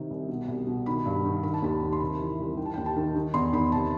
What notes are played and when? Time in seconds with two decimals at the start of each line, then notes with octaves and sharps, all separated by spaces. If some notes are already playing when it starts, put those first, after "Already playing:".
Already playing: C3 D#3
0.11 C2
0.29 B2
0.48 C2
0.67 B2
0.86 D#3 B5
1.06 G2
1.25 D#3
1.43 D#3 B5
1.54 A5
1.62 D#2 B5
1.82 D#3
1.93 C6
2.00 C3 B5
2.20 E3
2.39 C2
2.57 D#3 G5
2.66 A5
2.74 G5
2.77 D#2
2.86 A5
2.96 D#3
3.15 D#3
3.34 E2 C6
3.52 D#3 B5
3.72 C3 A5